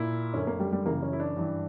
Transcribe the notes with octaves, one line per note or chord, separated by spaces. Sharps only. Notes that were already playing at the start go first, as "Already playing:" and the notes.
Already playing: A#2 E4
F#2 D3 C#4
A#3
G3
G3
F#2 C#3 E3 A#3
C#4
E4
D4
G2 E3